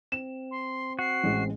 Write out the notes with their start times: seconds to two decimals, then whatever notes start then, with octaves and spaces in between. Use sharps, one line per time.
0.12 C4 E7
0.51 C6
0.99 F#4 C7
1.24 A1 G#3